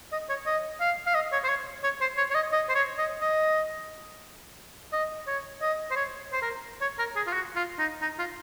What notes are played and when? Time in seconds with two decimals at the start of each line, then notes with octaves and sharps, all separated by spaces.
0.12 D#5
0.29 C#5
0.46 D#5
0.80 F5
1.06 F5
1.15 D#5
1.32 C#5
1.44 C5
1.49 C#5
1.83 C#5
2.01 C5
2.17 C#5
2.31 C#5
2.35 D#5
2.52 D#5
2.69 C5
2.75 C#5
2.98 D#5
3.21 D#5
4.93 D#5
5.27 C#5
5.61 D#5
5.91 C5
5.96 C#5
6.32 C5
6.42 A#4
6.81 C#5
6.99 A#4
7.16 G#4
7.27 F4
7.33 F#4
7.56 F4
7.79 D#4
8.02 D#4
8.19 F4